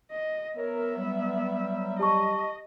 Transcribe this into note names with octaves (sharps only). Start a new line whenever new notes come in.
D#5
B3 A#4 C#5 E5
F#3 G3
G4 D#5 A5 C#6